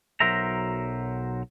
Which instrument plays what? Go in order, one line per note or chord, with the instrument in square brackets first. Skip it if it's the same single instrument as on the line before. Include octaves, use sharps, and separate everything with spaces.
[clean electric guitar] B1 F#3 A#4 C5 E5 A#5